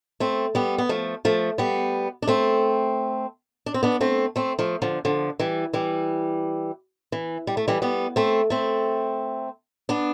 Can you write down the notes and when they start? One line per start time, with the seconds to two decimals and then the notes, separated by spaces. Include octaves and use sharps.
0.20 A3 C4
0.55 G3 B3
0.78 B3
0.89 F3 A3
1.25 F3 A3
1.58 G3 B3
2.22 D4
2.27 A3 C4
3.66 D4
3.74 C4
3.83 B3 D4
4.01 A3 C4
4.36 A3 C4
4.59 F3 A3
4.82 D3 F3
5.05 D3 F3
5.39 E3 G3
5.73 E3 G3
7.12 E3
7.47 G3
7.57 A3
7.68 E3 G3
7.82 G3 B3
8.16 A3 C4
8.50 A3 C4
9.89 B3 D4